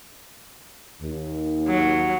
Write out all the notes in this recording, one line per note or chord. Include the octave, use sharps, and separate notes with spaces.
D#2
F#3